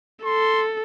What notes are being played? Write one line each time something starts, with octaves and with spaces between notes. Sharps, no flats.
A4 C6